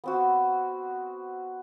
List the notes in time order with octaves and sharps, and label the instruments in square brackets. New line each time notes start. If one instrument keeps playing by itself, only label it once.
[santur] B3 C4 F#4